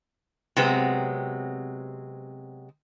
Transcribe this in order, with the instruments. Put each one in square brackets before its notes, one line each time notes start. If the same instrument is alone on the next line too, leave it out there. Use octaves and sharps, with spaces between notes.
[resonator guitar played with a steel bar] C3 F#3 G#3 B3 C4